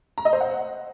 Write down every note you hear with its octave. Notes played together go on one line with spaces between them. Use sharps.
A#5
D#5
C5
F#5